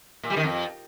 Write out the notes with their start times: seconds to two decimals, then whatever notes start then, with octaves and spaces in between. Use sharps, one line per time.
0.23 A#2
0.30 G3
0.37 D#3
0.43 F2